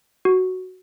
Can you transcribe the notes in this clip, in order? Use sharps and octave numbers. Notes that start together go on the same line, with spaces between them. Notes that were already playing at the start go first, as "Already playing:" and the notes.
F#4